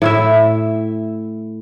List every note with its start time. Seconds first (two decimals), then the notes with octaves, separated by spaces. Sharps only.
0.02 A2 E4 E5